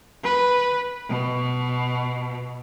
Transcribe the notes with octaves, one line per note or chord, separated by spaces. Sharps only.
B4
B2